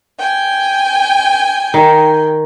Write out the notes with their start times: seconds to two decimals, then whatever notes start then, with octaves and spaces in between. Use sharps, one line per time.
0.17 G5 G#5
1.74 D#3